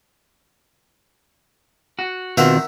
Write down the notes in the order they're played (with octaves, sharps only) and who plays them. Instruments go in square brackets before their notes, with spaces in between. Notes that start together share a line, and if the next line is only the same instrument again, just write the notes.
[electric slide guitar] F#4
[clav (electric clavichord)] B2 F4 [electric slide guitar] D#3 C4 [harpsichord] A#4 E5 F#5